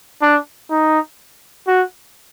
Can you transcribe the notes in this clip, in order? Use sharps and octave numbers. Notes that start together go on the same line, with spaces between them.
D4
D#4
F#4